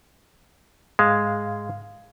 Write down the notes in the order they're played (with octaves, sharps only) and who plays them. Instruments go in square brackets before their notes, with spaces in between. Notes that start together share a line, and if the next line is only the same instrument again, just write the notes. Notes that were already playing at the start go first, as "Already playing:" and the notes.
[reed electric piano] G#2 F5 [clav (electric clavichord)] G#3